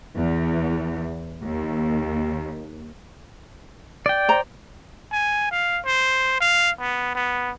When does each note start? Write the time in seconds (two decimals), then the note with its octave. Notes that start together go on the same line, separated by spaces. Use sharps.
0.17 E2
1.43 D#2
4.06 D5 G5
4.28 C5 A#5
5.12 G#5
5.51 F5
5.85 C5
6.41 F5
6.80 B3
7.15 B3